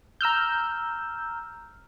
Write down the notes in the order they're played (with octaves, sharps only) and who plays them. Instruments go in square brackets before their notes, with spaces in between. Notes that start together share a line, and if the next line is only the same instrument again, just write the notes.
[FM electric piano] A#5 E6 F6 G6